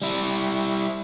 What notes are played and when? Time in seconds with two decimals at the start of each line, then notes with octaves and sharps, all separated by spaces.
0.02 G3 E4